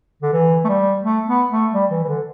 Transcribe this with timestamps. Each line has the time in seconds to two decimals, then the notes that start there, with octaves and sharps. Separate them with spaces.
0.23 D3
0.33 E3
0.64 A3
0.69 G3
1.03 A3
1.27 B3
1.50 A3
1.73 G3
1.91 E3
2.04 E3
2.08 D3